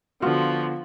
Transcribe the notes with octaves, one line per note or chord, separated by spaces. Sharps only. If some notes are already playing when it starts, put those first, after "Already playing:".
D3 F3 B3 F4 F#4